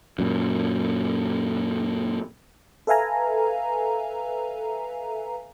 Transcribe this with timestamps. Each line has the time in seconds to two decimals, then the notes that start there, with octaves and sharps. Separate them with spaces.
0.19 F#2 A#2
2.87 A4 B4 E5 F5 G#5 A#5